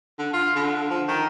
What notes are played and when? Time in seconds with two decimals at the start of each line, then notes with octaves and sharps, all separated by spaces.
0.19 D3
0.33 F4
0.56 D3
0.90 F3
1.08 D#3